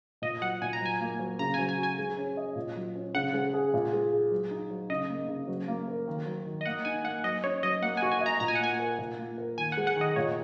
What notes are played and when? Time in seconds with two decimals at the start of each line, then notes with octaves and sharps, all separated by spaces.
0.22 A#2 D#5
0.41 F#3 F#5
0.62 A#2 G#5
0.73 A#5
0.81 F#3 G#5
1.01 A#3
1.19 F#3
1.39 C#3 A#5
1.54 F#3 G#5
1.69 G#5
1.78 F#4
1.83 G#5
1.98 G#3
2.17 C#4
2.37 D#5
2.56 A#2
2.76 F#3
2.96 C#4
3.14 C#3 F#5
3.34 G#3
3.54 G#4
3.74 A#2
3.93 G#3
4.13 G#4
4.31 F#3
4.50 D#4
4.70 F#3
4.90 C#3 D#5
5.10 A#3
5.28 C#3
5.48 F#3
5.68 A#3
5.88 A#4
6.08 D#3
6.26 F#3
6.46 D#3
6.61 D#5
6.66 A#3 F#5
6.85 D#4 G#5
7.04 A#3 F#5
7.24 F#3 D#5
7.44 C#4 C#5
7.63 F#3 D#5
7.82 A#3 F#5
7.97 G#5
8.02 F#4
8.12 G#5
8.21 D#5
8.26 A#5
8.40 A#2 A#5
8.48 G#5
8.55 F#5
8.60 A#3 G#5
8.79 A#4
8.99 A#2
9.19 A#3
9.38 A#4
9.58 D#3 G#5
9.72 F#5
9.77 G#3
9.87 F#5
9.96 D#3
10.01 D#5
10.16 A#2 C#5